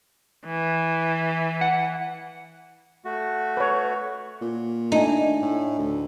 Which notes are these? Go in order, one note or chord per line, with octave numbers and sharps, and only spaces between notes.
E3
F#5
A3 F#4
B4 C#5
A#2
A3 D4 D#4 G#5
A2
D2